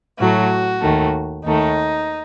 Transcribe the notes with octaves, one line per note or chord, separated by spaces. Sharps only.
A2 F#3 A3 F#4
D#2 D#3 A3
D#2 D#3 A3 D#4